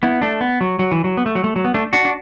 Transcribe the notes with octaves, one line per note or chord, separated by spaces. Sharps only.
B3 E4
A3 D4
B3
F#3
F#3
E3
F#3
B3
A3
F#3
A3
F#3
B3
A3 D4
D4 F#4
D4